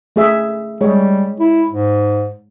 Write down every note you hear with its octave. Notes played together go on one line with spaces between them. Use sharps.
A3 G#4 E5
G3 G#3 G#4 C#5
E4
G#2